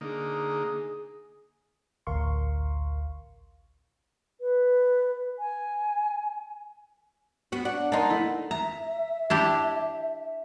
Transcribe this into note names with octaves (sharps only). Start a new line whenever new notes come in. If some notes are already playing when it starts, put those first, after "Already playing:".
D3 A#3 D#4 G#4
A1 D2 A#4 F5 C6 C#6
B4
G#5
B3 F#4
D4 F#5
A#3 D#4 A5 C6
A3 E4
E5 A#5
D4 E4 G4